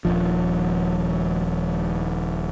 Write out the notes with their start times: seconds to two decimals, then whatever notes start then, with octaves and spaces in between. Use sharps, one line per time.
0.05 D#1 C2 F3